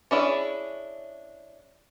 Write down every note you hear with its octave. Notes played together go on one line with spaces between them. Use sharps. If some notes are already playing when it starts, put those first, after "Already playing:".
C#4 D4 E4 G#4